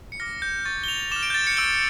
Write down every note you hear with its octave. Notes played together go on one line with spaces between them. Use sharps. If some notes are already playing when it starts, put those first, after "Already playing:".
C#7
D6 F6 A#6
G6
C#6 F6 A6
G7
F7
D6 F6 E7
D7
G6
A6
C#7
C#6 E6 G6 D7